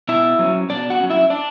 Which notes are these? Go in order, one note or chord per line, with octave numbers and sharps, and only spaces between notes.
B2 E4 E5
F#3 C#4
B2 D4 D5
F#4 F#5
F#3 C#4
E4 E5
D4 D5